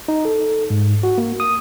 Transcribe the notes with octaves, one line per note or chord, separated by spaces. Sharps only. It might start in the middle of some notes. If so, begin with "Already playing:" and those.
D#4
A4
G#2
F#4
A#3
D#6